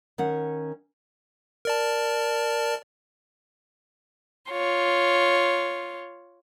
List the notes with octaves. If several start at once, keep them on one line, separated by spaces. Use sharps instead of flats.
D#3 C#4 F#5
A#4 D5 A5
F4 C#5